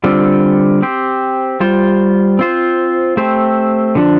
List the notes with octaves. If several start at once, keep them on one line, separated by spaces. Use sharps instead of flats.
D3 G3 C4 F4
C4 G4 C5
G3 F4 C5
C4 F4 C5
A3 C4 G4 C5
D3 F3 D4